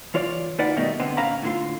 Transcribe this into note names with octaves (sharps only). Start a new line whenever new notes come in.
E3 F4 C#5 D5
D2 D#4 F4 B4 D5 F#5
G2 B2 D#3 A3 D#4
D3 B3 C4
A#2 D3 C#4 F5 A#5 B5
A2 D3 F4